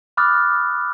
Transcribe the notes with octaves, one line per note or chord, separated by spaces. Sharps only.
B5 D6 D#6 F6 F#6 A6